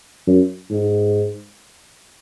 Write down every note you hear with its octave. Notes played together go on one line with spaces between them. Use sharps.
F#2
G#2